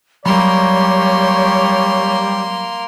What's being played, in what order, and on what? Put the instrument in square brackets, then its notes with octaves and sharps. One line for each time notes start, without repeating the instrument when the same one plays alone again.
[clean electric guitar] F#3 B5 [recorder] G3 [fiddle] A#3 C6 [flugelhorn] C#5